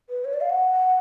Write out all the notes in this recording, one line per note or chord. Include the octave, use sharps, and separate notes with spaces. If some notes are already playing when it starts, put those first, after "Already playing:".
B4
C#5
D5
F5
F#5